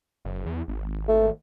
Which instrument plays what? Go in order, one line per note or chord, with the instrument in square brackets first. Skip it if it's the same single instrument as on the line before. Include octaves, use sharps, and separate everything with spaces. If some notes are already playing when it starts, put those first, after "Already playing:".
[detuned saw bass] F#1
E2
G#1
[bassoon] A3